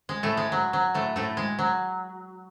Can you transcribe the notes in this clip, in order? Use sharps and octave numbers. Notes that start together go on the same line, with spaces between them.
G#3
A2 A3
G#3
F#3
F#3
A2 A3
A2 A3
G#3
F#3